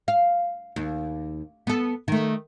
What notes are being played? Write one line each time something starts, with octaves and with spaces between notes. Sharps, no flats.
F5
D#2
B3 A4
D#3 A3